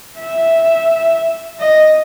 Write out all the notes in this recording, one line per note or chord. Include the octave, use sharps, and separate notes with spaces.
E5
D#5